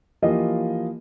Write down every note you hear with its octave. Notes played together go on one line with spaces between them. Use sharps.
E3 F3 A#3 F4 G4 D#5